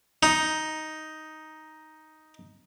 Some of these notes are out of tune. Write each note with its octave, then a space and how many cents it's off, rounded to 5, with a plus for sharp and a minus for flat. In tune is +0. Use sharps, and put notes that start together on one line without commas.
D#4 +5